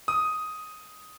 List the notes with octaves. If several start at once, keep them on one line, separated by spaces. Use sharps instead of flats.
D#6